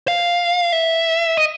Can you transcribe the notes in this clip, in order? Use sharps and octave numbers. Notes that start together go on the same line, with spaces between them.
F5
E5
D#5